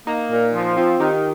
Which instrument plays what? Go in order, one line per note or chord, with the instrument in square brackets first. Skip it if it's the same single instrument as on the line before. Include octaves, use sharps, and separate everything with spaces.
[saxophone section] A#3 [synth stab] D#4
[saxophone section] A#2
F3
[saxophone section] C4 [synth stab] F4
[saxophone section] D#3 [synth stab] D#4 G4